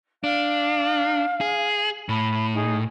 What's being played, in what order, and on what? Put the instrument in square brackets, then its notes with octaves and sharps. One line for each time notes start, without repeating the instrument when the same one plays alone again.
[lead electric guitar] D4 [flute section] F5
[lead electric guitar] G#4
[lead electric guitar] A2 [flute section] B5
[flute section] D#4 G#4